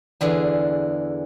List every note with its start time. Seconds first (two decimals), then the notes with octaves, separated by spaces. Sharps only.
0.21 E2 D3 E3 G#4